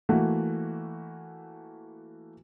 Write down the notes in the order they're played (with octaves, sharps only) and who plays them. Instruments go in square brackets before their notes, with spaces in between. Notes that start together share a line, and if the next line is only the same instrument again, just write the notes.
[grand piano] E3 A3 A#3 F#4